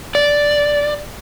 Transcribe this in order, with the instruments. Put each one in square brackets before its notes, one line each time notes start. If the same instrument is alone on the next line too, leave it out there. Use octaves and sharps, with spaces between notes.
[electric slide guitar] D5